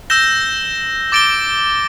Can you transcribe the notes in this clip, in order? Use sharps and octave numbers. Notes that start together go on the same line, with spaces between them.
E6 G6 A#6 E7 G7
D6 A6 D7 G7